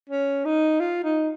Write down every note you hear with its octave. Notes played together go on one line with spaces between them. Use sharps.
C#4
D#4
F4
D#4